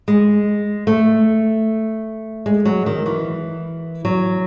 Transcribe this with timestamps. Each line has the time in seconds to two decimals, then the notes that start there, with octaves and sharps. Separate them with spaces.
0.08 G#3
0.87 A3
2.46 G#3
2.65 F#3
2.86 D#3
3.06 E3
4.05 F#3